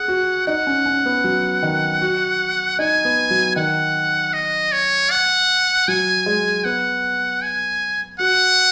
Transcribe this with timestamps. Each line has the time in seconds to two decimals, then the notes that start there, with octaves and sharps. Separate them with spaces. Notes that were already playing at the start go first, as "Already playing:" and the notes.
Already playing: G#4 F#5
0.08 F#4
0.47 D#4 F#5
0.67 C#4
0.86 C#4
1.06 B3
1.24 F#3
1.63 D#3
2.02 F#4
2.79 D#4 G#5
3.05 B3
3.30 F#3
3.56 D#3 F#5
4.34 D#5
4.72 C#5
5.11 F#5
5.88 F#3 G#5
6.26 G#3
6.65 B3 F#5
7.42 G#5
8.19 F#4 F#5